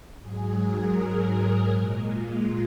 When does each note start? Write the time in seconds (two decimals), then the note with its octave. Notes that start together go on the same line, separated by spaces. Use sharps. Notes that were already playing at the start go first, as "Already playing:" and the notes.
0.20 G#2 F#3 G#4
0.58 A#4
0.95 G#4
1.72 A#2 G#3
2.10 F4